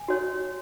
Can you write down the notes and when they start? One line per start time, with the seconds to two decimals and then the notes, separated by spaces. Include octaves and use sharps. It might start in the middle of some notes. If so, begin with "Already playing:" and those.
Already playing: G#5
0.08 F#4 C#5